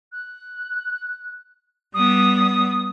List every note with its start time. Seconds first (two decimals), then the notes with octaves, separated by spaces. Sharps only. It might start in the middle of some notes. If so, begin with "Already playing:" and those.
0.12 F#6
1.94 G3 B3 D#6